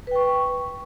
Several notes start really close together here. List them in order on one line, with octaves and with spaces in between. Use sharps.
B4 G5 C#6